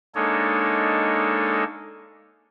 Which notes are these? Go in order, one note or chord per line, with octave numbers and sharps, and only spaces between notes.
G#3 A#3 D4 D#4 A4 C#5